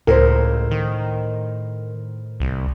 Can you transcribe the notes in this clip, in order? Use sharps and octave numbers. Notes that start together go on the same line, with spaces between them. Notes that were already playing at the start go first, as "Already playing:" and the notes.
C#2 A2 A#4 C5
D#3
C2